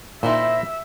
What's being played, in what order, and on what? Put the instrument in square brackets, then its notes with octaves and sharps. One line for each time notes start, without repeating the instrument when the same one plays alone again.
[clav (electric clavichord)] A#2 [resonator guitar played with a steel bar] D#4 E4 C5 [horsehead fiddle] E5